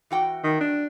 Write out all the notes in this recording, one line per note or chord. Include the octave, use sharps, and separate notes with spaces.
E3 F#4 G5
D#3
D4